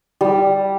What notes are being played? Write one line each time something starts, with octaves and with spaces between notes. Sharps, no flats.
G3